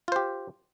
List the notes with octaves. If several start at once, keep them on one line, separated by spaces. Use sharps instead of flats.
F4 G4 C5